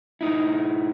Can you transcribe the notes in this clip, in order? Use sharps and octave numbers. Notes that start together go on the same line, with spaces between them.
A2 D#4 E4